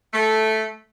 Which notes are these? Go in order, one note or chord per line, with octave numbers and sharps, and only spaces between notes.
A3